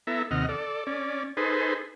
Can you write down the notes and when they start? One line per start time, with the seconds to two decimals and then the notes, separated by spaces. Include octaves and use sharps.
0.07 B3 E4 A4 E5 A#5
0.31 D#2 C3 D#5 F#5 F6
0.49 A4 D5
0.87 C#4 D5
1.37 D#4 G#4 A4 B4 C5